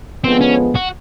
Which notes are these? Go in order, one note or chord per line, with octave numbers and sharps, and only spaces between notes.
D3 F3 G#3 B3 C4
C#4
F#4